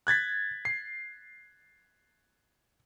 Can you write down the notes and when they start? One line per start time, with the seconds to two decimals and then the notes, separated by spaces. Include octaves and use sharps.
0.07 F#6 G#6 A6 B6
0.65 C7